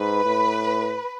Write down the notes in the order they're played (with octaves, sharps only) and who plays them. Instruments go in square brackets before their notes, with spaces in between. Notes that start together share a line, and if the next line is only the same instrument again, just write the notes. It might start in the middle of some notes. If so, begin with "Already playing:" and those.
Already playing: [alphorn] G#2 [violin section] B4
[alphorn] A2